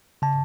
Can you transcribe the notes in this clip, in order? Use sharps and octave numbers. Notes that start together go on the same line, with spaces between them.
C#3 A5